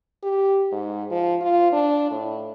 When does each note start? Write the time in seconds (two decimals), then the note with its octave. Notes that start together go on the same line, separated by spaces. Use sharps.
0.23 G4
0.72 G#2
1.10 F3
1.41 F4
1.72 D4
2.11 A2